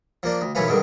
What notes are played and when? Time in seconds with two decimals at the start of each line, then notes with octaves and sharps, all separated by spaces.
0.23 F3 A#3 D4
0.41 D2
0.55 B1 F#2 E3 C#4 B4 F5
0.67 C#2 G2 D3 D#3